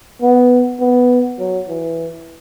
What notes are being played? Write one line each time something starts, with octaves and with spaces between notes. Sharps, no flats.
B3
B3
F#3
E3